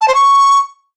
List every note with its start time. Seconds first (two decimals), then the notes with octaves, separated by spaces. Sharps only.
0.01 A5
0.08 C5
0.15 C#6